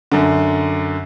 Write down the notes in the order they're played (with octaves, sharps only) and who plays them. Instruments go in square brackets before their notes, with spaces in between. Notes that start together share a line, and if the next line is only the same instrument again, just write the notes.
[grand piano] F#2 D3